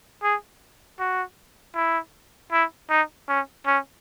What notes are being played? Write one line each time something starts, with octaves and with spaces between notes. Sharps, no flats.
G#4
F#4
E4
E4
D#4
C#4
C#4